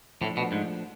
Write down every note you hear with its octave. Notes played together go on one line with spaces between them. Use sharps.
A2 F3 A3 D4
B2
G#2